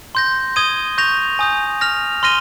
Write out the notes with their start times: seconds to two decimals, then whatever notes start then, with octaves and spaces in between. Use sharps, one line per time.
0.15 C6 G6 A#6
0.56 D#6 G#6 D#7 G7
0.98 C#6 G6 A#6 F7
1.39 G#5 D#6 G6
1.81 F6 A#6 F7
2.23 C6 F6 A#6 D#7 G7